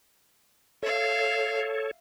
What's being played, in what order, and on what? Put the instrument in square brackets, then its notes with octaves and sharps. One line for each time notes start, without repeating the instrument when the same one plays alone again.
[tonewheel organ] A4 C#5 [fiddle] E5 F5